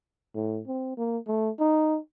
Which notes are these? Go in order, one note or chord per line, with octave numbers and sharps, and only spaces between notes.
A2
C4
A#3
A3
D#4